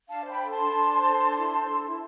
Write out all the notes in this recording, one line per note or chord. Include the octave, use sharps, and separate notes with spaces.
D4 F5 A5
C5
G5 B5
A4
A5 C6
D4
D4
C5
A4
D4
E4
C5
A4
E4